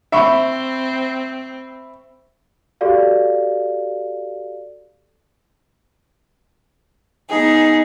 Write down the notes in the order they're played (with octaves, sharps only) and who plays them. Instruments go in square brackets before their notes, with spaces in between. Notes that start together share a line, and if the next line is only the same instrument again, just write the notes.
[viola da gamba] C4 [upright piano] E5 B5 C#6
[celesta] F#4 G4 A4 D5 F5
[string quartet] B3 G#4 [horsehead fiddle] D#4